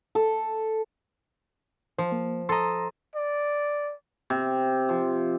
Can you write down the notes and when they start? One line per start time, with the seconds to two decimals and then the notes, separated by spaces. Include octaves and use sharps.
0.15 A4
1.99 F3 C5
2.12 A#3
2.49 A4 D#5 A#5 C6
3.15 D5
4.30 C3
4.89 F3